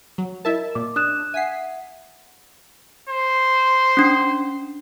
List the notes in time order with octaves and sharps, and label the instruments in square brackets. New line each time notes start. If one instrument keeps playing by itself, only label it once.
[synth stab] F#3
[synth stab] E4 E5 A5 [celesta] A#4 D#5
[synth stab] A#2 [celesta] D6
[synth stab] D4 [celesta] D#6 F#6 E7
[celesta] E5 F#5 [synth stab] G#5 B6 C7
[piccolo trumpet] C5
[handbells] C#4 D4